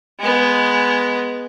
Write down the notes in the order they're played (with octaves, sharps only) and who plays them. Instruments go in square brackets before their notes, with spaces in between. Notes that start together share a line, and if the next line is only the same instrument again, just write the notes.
[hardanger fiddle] G#3 B3